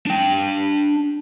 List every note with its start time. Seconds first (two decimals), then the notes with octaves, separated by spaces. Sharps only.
0.06 D4 G5